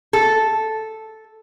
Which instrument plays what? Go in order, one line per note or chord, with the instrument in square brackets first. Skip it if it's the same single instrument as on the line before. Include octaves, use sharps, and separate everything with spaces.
[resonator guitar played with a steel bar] A4